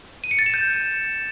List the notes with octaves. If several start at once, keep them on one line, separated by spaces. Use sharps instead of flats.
D#7
C#7
A6
E7
G6